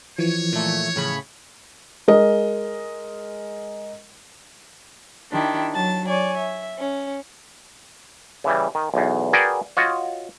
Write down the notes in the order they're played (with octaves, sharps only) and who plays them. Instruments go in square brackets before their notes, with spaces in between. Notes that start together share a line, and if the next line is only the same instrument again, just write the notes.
[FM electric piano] E3 F3 [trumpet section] C#5
[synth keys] A#2 A3
A2 C#3 B5
[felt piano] G#3 A#4 D#5
[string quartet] D#3 D4 E4 G4
F#3 A5 A6
C#5 D5 G#5
E5
C#4
[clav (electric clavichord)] C#3 E3 G3
D#3
B1 E2
F#4 G#4 A#4 B4 D5 G5
F4 F#4 C#5 D#5